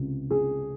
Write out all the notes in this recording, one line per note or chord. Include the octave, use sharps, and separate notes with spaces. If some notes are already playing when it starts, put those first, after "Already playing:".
Already playing: C#2 C3
C#2 G#4